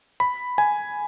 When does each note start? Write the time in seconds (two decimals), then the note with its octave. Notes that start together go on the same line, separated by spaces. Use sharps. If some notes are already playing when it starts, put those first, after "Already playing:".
0.20 B5
0.58 G#5